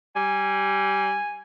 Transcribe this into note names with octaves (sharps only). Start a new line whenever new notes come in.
G3 G#5